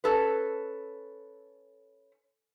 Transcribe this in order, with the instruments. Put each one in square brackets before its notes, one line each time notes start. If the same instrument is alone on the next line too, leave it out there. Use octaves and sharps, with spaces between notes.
[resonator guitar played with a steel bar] C#4 A4 B4